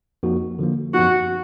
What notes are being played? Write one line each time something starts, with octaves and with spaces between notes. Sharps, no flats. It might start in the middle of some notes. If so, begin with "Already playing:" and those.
F2 F3 A#3 D#4 F#4
D3 F3 A#3
F#2 F3 B3 D#4 F#4